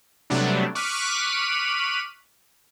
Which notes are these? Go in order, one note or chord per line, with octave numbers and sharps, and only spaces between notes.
C3 F#3 G3 A3 B3 D4
C#6 D6 F6 F#6 B6 D#7